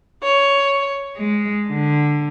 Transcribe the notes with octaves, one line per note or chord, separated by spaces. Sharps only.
C#5
G#3
D3